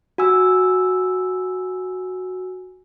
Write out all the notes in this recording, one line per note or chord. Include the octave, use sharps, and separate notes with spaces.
F#4 G#5 E6